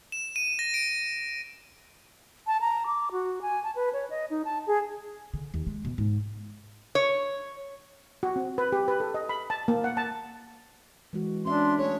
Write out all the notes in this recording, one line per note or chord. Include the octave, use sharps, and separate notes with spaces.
E7
D#7
A#6
D7
A5
A#5
D6
F#4
G#5
A5
B4
C#5
D#5
D#4
A5
G#4
D3
D#2
G#3
B2
G#2
C#5
F#4
C4
B4
G4
B4
A4
D#5
B5
A5
A#3
F#5
A5
E3 G#3 F#4
C#4 D4 E5 C6
A3 D4 G#4 C#5